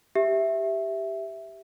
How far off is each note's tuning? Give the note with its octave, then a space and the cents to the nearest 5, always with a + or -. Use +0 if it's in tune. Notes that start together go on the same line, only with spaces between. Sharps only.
G4 +0 E5 +0